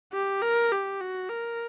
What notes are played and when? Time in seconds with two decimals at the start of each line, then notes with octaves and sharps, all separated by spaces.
0.13 G4
0.42 A#4
0.72 G4
1.01 F#4
1.30 A#4